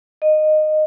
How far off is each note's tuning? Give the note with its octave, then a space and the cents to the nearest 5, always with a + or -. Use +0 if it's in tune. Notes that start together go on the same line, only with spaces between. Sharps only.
D#5 -15